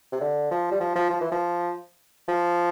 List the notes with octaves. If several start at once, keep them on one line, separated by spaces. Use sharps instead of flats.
C3
D3
F3
G3
F3
F3
F3
E3
F3
F3